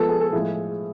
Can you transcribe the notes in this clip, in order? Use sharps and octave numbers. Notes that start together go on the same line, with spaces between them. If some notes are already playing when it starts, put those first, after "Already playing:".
Already playing: F3 G#3 B3 F4 A4
G#4
A4
A2 F3 G#3 G#4